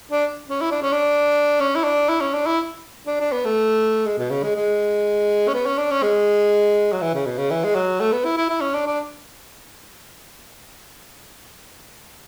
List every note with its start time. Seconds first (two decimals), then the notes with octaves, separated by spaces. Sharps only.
0.11 D4
0.49 C#4
0.61 E4
0.71 D4
0.82 C#4
0.92 D4
1.60 C#4
1.75 E4
1.84 D4
2.09 E4
2.21 C#4
2.33 D4
2.46 E4
3.07 D4
3.20 D4
3.32 B3
3.45 A3
4.06 G#3
4.18 B2
4.31 C#3
4.43 G#3
4.56 G#3
5.48 C#4
5.54 B3
5.66 C#4
5.78 D4
5.91 C#4
6.02 G#3
6.93 F#3
7.02 E3
7.14 C#3
7.26 B2
7.38 C#3
7.50 E3
7.64 G#3
7.75 F#3
8.00 A3
8.12 B3
8.25 E4
8.37 E4
8.49 E4
8.61 C#4
8.74 D4
8.86 D4